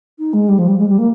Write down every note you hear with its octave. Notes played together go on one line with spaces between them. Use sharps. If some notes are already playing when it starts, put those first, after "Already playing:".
D#4
G#3
G3
F3
G3
G#3
G3
A#3